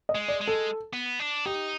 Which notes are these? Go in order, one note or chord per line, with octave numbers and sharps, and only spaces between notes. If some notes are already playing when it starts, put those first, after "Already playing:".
D#5
G#3
D5
G#3
A4
B3
D4
D#4 G4